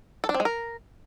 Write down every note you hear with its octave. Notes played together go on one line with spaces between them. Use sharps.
A4
D4
C4
G#3
A#4